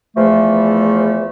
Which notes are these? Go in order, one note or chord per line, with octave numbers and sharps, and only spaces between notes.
E2 E3 F3 A3